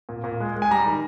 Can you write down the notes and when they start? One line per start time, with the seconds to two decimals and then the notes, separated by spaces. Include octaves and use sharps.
0.09 A#2
0.24 A#2
0.40 G#3
0.56 G#3
0.62 G#5
0.71 G3 A#5
0.86 D#3